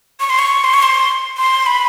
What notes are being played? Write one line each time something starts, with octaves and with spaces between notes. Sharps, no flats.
C#6
C6
C#6
C6
C#6
C6
C6
B5